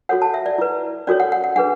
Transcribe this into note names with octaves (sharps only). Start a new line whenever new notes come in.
F#4 A4 C#5 F#5
A5
E5
D5
E4 B4
C#4 F#4 A4 C#5 D5
F#5
F#5
F#5
D4 G#4 B4 F#5